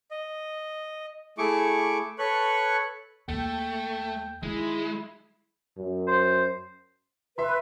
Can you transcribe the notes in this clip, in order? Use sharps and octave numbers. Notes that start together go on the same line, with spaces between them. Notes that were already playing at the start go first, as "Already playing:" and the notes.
D#5
A3 E4 G#4 C#6 D6
A4 B4 C#5 C#6 F#6
D#2 G#3 A3 G5
D#3 G#3 E4
F#2
C5
B4 E5 C6